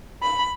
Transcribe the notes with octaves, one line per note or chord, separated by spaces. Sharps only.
B5